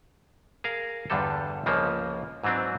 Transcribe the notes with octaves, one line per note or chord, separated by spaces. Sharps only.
G#4 A#4 F5
E2 G2 D3 G3 A4
C#2 C#3 F3 A#3
G#2 E3 F#3 C4 D4